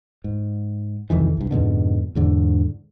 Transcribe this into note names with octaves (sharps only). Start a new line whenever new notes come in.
G#2
C2 F2 D#3 E3
C2 G2
F2 G#2 B2 D3
E2 G#2 D3